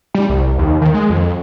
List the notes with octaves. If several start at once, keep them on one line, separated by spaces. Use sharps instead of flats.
G3
C2
D#2
D#3
G#3
F2